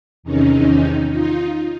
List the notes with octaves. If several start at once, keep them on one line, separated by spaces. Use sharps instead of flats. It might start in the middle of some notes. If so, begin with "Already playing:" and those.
E2 C3 D#3 C#4 D#4
D#4 F4